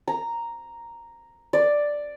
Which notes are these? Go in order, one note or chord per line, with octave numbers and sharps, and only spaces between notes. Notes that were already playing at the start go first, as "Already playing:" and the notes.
A#5
D5